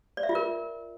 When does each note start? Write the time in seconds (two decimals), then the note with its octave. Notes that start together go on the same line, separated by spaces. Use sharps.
0.17 D5
0.23 E5
0.29 F4
0.35 A#4